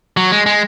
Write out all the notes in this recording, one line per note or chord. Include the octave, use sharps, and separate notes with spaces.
F#3
G#3
G#3